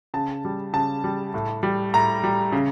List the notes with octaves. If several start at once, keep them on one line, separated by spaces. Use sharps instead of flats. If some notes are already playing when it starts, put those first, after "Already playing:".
C#3 A5
G3
C#3 A5
G3
A2
G3
A2 A#5
G3
C#3